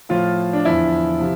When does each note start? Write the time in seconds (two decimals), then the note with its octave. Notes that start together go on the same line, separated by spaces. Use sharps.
0.09 A2 F3 F4
0.53 D4
0.65 E2 D3 F3 E4
1.20 C3 F3